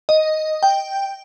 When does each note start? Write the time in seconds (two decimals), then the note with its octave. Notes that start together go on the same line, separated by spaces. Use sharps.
0.09 D#5
0.63 G5